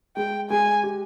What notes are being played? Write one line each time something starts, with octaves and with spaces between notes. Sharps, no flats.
G#3 G5
G#3 G#5
G4